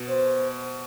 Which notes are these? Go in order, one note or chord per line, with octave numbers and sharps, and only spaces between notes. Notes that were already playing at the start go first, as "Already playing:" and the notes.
Already playing: B2
C5